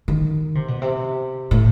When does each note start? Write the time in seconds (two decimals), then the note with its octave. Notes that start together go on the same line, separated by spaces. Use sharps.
0.08 D#3
0.55 C3
0.68 B2
0.82 C3
1.51 A2